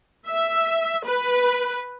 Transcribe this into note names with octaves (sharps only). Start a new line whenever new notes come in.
E5
B4